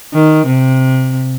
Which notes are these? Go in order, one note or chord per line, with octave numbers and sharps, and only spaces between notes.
D#3
C3